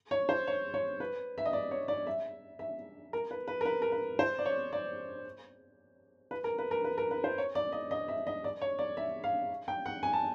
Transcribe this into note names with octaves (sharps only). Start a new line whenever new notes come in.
C#5
C5
C#5
C#5
B4
E5
D#5
D5
C#5
D5
E5
E5
A#4
B4
B4
A#4
B4
A#4
B4
C5
D5
C#5
D5
B4
A#4
B4
A#4
B4
A#4
B4
C5
C#5
D5
D#5
D#5
E5
D#5
D5
C#5
D5
E5
F5
G5
F#5
G#5
A5